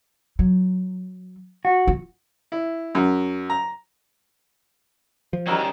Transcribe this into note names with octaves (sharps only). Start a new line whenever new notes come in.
F#3
F#4
F4
E4
F#2
A#5
F3
D#3 G3 C#4 D#4 E4 F#4 A#4